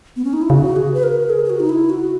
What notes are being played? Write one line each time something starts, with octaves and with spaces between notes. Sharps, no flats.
B3
C#4
D#4
E4
C#3 F#4
G#4
B4
A#4
G#4
G#4
F#4
D#4
E4
F#4